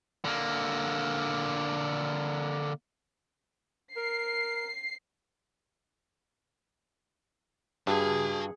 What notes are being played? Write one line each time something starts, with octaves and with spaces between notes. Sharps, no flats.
D3 A#3
A#4 C7
G2 F#4 G#4 A5